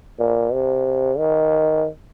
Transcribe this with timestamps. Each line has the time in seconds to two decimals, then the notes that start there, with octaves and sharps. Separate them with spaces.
0.20 A#2
0.53 C3
1.18 D#3